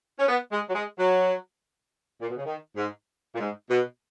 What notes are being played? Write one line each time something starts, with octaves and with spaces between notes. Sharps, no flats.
C#4
B3
G#3
F#3
G#3
F#3
A#2
B2
C#3
D#3
G#2
A#2
G#2
B2